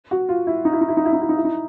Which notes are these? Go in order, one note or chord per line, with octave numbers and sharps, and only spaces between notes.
F#4
F4
E4
D#4
E4
D#4
E4
D#4
E4
D#4
E4
D#4
E4
D#4